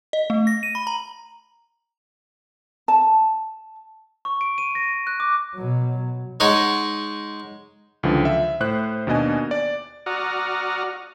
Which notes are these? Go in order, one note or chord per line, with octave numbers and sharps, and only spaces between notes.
D#5
A3
A#6
D#7
B5
A#5
A5
C#6
D7
D#7
A#6
F#6
D6
B2 F#3
G#3 D#4 C#5 F#5
C#2 D3 E3 F3
E5
A2 C5 F#6
D#2 B2 D4 D#5 G#5
D5
F#4 D5 F#5 A#5 D#6 F6